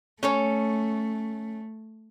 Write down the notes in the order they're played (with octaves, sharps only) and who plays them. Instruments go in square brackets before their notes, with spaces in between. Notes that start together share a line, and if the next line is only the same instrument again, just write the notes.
[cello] A3 [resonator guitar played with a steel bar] C#4 A4 C#5